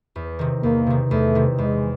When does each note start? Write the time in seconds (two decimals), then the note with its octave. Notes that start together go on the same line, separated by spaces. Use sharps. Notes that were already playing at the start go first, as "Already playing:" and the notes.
0.16 E2
0.39 C3 D#3
0.63 E2 A#3
0.87 C3 D#3
1.11 E2 A3
1.35 C3 D#3
1.58 E2 G#3